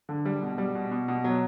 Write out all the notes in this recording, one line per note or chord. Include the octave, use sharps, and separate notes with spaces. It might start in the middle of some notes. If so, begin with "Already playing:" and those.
D3
G3
B2
G3
B2
B2
B2
F#3